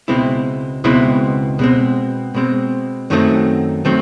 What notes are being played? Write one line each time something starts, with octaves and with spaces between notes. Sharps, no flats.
C#2 B2 G#3 C4 E4
C#2 B2 G#3 C4 E4
B2 G#3 C4
B2 G#3 C4
F#2 D#3 F#3 A3 C4
D#3 F#3 A3 C4